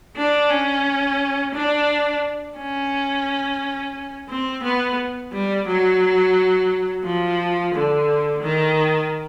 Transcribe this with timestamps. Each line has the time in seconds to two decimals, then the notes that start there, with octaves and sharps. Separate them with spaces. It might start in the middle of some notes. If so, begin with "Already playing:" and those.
0.17 D4
0.50 C#4
1.54 D4
2.57 C#4
4.29 C4
4.63 B3
5.32 G3
5.67 F#3
7.04 F3
7.74 D3
8.42 D#3